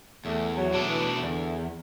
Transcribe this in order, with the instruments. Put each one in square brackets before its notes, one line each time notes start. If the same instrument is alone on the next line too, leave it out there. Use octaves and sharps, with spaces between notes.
[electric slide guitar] E2 [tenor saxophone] A3
[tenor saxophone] F#3
[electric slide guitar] B2 A3 D4
[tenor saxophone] E3
[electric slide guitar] E2 [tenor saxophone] D3